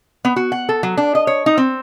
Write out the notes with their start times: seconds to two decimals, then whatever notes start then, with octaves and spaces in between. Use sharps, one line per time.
0.25 B3
0.36 F#4
0.52 F#5
0.69 A4
0.83 F#3
0.97 D4
1.15 D#5
1.27 C#5
1.46 D#4
1.58 C4